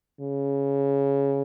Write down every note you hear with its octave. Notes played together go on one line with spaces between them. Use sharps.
C#3